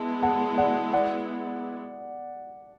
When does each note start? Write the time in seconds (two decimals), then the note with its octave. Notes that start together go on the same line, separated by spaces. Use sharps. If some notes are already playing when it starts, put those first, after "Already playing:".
Already playing: G#3 B3 E4 A5
0.22 F#5 A5
0.57 D5 F#5
0.93 D5 F#5